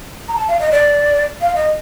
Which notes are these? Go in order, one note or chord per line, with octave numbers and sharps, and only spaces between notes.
A#5
A5
F5
D#5
D5
F5
D#5